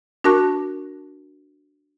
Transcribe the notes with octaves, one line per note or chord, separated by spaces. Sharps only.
D4 F#4 A#4 A5 C#6 F#6